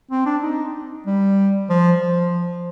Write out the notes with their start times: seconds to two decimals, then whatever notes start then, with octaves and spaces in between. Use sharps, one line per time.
0.11 C4
0.26 D4
0.43 D#4
1.06 G3
1.70 F3
2.01 F3